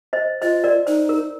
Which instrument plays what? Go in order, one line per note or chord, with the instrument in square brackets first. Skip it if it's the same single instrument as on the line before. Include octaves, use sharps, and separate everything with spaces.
[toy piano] C5 D#5
[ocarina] F4 [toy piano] C5 D#5
[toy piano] A#4 D5
[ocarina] D#4 [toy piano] C5
[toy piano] A#4